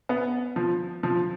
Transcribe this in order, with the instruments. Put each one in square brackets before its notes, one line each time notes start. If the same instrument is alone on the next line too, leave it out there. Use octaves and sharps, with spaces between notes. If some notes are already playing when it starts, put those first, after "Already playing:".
[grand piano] B3
F3
F3